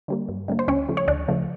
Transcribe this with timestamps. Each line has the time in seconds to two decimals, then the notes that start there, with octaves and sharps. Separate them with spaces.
0.08 D3 G3 A#3
0.29 G2
0.48 D3 G3 A#3
0.59 C5
0.68 D2 C#4 C#5
0.89 C#3 F3 A3
0.97 C#5
1.08 D2 D4 D5
1.28 C#3 F3 A3